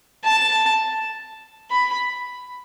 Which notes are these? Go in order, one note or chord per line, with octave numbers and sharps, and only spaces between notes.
A5
B5